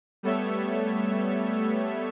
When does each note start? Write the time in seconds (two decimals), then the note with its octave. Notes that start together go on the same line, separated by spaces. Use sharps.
0.23 G3 A3 B3 A4 C#5 E5